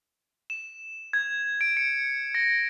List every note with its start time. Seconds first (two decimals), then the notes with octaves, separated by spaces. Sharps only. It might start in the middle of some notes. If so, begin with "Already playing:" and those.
0.50 E7
1.13 G#6
1.61 D7
1.77 C#7
2.35 A#6